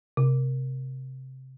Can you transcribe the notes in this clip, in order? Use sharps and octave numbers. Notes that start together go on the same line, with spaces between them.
C3